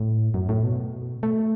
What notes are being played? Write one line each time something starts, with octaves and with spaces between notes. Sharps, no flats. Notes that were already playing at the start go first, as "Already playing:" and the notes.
Already playing: A2
F#2
A2
B2
A3